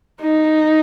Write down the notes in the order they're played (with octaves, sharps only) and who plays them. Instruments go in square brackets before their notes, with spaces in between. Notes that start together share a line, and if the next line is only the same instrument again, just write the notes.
[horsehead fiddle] D#4